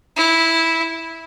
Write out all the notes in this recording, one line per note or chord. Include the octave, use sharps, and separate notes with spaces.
E4